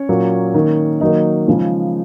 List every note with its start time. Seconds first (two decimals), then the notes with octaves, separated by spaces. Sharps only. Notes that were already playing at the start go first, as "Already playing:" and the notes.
Already playing: C#4 C#5
0.09 A#2 F#3 A#3
0.54 D#3 A#3
1.01 D#3 F#3 A#3 D#4 D#5
1.48 C#3 F3 G#3